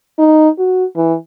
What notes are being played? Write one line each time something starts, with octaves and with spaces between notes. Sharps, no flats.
D#4
F#4
E3